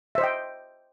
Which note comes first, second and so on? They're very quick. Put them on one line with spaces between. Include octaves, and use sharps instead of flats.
E5 C5 D#5 G5